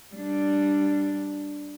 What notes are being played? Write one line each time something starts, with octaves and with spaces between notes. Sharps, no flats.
G3 D4